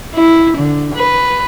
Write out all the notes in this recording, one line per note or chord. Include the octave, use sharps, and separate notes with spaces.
E4
D3
B4